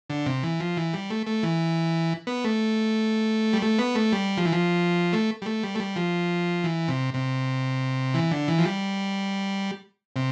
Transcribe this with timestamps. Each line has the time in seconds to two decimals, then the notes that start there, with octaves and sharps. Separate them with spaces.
0.10 D3
0.26 C3
0.43 E3
0.60 F3
0.77 E3
0.93 G3
1.10 A3
1.27 A3
1.43 E3
2.27 B3
2.44 A3
3.53 G3
3.62 A3
3.79 B3
3.95 A3
4.13 G3
4.37 F3
4.45 E3
4.52 F3
5.13 A3
5.42 G3
5.46 A3
5.63 G3
5.75 A3
5.80 G3
5.96 F3
6.64 E3
6.88 C3
7.14 C3
8.14 E3
8.31 D3
8.48 E3
8.58 F3
8.65 G3
10.16 C3